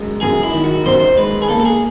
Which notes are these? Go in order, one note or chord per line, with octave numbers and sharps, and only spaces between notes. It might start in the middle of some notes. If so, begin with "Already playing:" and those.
Already playing: F#2 G#3
F#2 G#4
E4
D#3
F#4
F#2 C5
C5
G#3 B4
G#4
A#3 A4
A4
G#4